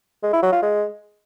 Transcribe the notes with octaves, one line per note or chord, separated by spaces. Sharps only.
G#3
E4
F#3
F4
G#3